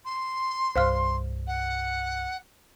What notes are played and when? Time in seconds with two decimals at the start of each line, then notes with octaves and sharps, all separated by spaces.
0.05 C6
0.76 C2 G2 C5 F5 F6
1.47 F#5